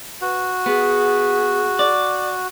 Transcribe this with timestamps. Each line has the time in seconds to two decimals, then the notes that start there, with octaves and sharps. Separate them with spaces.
0.21 F#4 B4
0.66 B3 G#4
1.79 D5